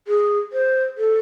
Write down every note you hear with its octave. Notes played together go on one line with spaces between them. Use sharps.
G#4
C5
A4